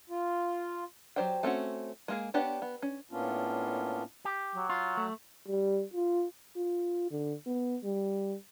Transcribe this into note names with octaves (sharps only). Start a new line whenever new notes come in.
F4
F#3 G4 C5 D5 G5
A3 C4 C#4 F#4
G#3 A#3 G#4
B3 D4 G4 C#5
B3
C#4
A2 A#3 B3 C#4 D4 F4
G4
F#3
F4
A3
G3
F4
F4
D3
B3
G3